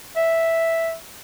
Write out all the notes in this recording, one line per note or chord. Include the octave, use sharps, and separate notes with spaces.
E5